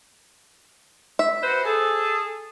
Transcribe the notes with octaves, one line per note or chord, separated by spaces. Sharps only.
E5
F#4 B4 C5
G#4 A4